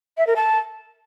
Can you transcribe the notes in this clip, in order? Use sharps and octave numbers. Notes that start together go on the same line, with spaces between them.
E5
A#4
A5